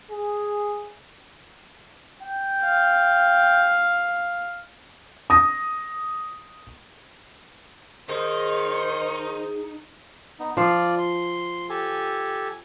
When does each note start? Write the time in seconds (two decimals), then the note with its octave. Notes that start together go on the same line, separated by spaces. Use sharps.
0.11 G#4
2.22 G5
2.63 F5
5.30 D#6 A#6
8.09 D#3 D#4 G#4 C5
10.39 B3 D#4
10.57 F3 F4 D5 F5
10.99 C6
11.69 G4 A4 G#5